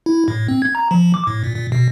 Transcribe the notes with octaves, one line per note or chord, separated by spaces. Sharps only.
E4
A2
C4
G#6
A#5
F3
D6
A2
A#2
A#2
B2